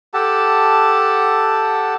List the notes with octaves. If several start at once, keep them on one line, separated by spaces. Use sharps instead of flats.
G4 A4 F#5 A5